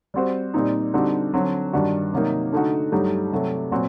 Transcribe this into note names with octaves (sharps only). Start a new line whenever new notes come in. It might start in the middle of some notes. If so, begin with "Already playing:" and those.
G3 C4 F#4 C5
A#2 G3 C4 D#4
D3 G3 C4 D#4 F#4
D3 F#3 C4
G2 D#3 G3 D4 F#4
C3 F#3 A#3 D#4
D3 A3 D#4 F#4
G2 F#3 A3 D#4 G4
C3 F#3 A3
A#2 F#3 C4 F#4